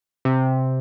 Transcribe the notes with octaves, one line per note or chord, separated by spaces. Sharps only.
C3